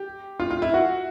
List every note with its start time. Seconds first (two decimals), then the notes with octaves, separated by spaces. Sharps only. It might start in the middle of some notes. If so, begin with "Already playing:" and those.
Already playing: G4
0.40 F4
0.51 F4
0.62 E4
0.74 F#4